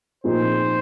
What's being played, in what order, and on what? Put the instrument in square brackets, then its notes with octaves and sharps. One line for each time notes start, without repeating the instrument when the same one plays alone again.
[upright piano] A#2 F3 C4 D#4 G#4 [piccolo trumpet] C5